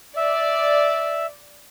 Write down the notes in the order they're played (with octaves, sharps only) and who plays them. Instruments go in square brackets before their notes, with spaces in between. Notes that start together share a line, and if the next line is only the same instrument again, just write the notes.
[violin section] D5 [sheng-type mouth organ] E5